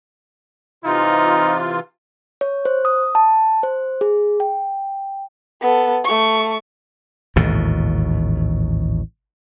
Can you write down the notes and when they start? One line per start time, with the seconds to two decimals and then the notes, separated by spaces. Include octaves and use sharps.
0.84 C3 E3 D#4 F4
2.41 C#5
2.65 C5
2.85 D#6
3.15 A5
3.63 C5
4.01 G#4
4.40 G5
5.61 B3 A4
6.04 A3 C#6
7.36 A1 D#2 G#2 B2